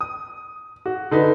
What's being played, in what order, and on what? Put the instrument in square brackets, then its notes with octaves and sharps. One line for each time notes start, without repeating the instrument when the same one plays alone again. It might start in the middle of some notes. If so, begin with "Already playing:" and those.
[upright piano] D#6
F#4
D3 D#4 B4